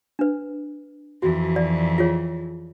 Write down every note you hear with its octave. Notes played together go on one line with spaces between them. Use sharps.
D4 B4
F2 E3 F#4
D5
F4 G#4 C#5